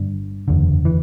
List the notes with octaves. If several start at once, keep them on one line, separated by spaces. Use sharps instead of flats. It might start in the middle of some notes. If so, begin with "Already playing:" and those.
Already playing: G1 G2 D3
F#1 E2 D3
E3